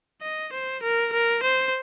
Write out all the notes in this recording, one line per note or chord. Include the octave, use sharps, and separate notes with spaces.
D#5
C5
A#4
A#4
C5